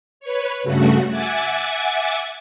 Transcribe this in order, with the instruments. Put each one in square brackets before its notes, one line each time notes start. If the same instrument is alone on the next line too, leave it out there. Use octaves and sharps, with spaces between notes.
[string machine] B4 C#5
G2 C#3 A3 F#4
E5 F#5 G#5 D6 G#6 A6